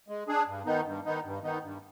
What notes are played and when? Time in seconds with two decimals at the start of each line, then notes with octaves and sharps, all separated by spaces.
0.08 G#3
0.28 D4 G#4
0.47 G2
0.66 D#3 B3 D#4
0.85 G2
1.05 D#3 B3 D#4
1.24 G2
1.43 D#3 B3 D#4
1.63 G2